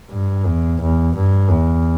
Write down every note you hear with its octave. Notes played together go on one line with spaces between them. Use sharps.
G2
E2
E2
G2
E2